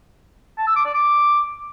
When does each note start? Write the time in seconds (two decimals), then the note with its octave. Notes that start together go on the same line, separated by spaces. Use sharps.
0.58 A5
0.67 E6
0.76 D6
0.85 D5
0.94 D6